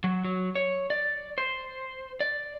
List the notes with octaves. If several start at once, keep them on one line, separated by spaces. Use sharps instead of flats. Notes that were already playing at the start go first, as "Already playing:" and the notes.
F#3
F#3
C#5
D5
C5
D5